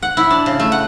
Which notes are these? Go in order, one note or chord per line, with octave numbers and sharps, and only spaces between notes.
F#5
E4
D4
C#3
A3
F#5